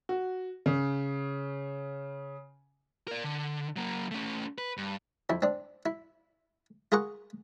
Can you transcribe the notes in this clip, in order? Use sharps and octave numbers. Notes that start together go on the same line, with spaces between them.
F#4
C#3
A#4 D5
D3
F#3 A#3
A3 C#4
B4
G2
F2 E4
C4 D4
E4
F4 G#4 A#4 F#5 C#6